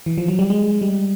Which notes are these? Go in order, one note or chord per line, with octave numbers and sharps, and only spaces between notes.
E3
F3
F#3
G3
G#3
G3